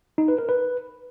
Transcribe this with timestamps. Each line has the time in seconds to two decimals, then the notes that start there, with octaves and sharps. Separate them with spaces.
0.18 D#4
0.28 B4
0.39 A#4
0.49 B4